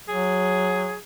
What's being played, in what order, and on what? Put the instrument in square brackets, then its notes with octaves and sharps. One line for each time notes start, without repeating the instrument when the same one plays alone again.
[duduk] F#3 [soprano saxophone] G#4